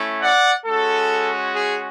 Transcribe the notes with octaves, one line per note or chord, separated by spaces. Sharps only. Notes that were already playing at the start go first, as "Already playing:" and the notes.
Already playing: A3 C#4 E4
D5 F#5
G#3 C#4 F#4 A4
G#4